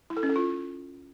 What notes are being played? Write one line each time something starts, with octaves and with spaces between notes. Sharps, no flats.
E4
A4
C#4
A4
F4